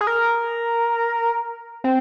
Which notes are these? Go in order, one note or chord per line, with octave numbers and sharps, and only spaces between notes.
G#4
A#4
C4